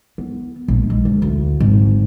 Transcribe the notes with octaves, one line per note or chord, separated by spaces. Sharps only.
B3
A#1
G#3
D2
D2
G#1